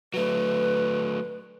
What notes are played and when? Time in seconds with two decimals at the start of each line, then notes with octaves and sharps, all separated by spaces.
0.14 F#3 A3 B4